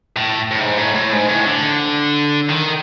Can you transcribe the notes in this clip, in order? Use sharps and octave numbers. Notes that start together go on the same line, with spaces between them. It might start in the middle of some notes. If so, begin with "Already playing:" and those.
A2
A2
G#2
A2
A2
G#2
A2
D3
D#3